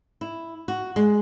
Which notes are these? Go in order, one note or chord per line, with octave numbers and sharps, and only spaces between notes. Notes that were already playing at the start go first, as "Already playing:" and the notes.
E4
F#4
G#3